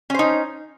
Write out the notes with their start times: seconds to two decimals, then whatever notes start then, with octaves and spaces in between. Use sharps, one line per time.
0.10 C#4
0.14 C5
0.19 D#4